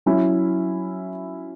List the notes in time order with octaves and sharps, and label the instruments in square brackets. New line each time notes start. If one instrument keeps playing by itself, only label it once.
[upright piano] F#3 C#4 E4